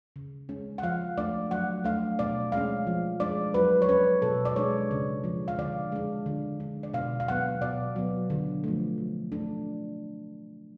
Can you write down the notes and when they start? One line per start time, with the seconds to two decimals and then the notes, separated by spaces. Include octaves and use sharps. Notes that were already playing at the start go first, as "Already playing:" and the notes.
0.16 C#3
0.49 G#3 C#4
0.78 F#5
0.83 F3 F5
1.18 A3 D4 D5
1.51 F#3 F#5
1.84 A3 D4 F5
2.19 B2 D5
2.52 G#3 C#4 F5
2.87 F3
3.20 G#3 D4 D5
3.54 F#3 B4
3.82 C#5
3.89 C#4 B4
4.22 B2 A4
4.45 D5
4.56 G#3 D4 C#5
4.91 C#3
5.24 F3 G#3
5.48 F5
5.59 D3 D5
5.92 G#3 D4
6.26 D3
6.60 G#3 D4
6.83 D5
6.93 B2 F5
7.20 F5
7.28 F#3 B3 F#5
7.62 B2 D5
7.96 F#3 B3
8.30 D3
8.64 F3 A3
8.98 F#3
9.32 A3 D4